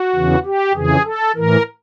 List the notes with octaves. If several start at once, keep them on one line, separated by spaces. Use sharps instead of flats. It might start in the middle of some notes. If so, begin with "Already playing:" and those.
Already playing: F#4
E2 C#3 E3
G4
F2 C#3 E3 G#4
A4
A2 E3 A#4